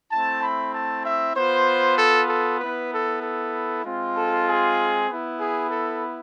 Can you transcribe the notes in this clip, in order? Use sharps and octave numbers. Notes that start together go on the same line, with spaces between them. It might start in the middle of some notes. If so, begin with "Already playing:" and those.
A3 C4 E4 A5
B5
A5
E5
B3 F4 C5
A4
A4
B3 E4 B4
A4
A4
G#3 C4 F4
A4
G#4
B3 E4
G#4
A4